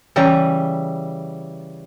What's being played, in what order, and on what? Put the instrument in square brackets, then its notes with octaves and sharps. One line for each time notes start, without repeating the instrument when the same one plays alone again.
[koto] C#3 E3 G3 A#5